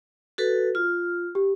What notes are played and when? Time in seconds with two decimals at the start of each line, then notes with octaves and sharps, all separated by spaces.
0.38 F#4 A4 B4
0.75 F4 F6
1.35 G4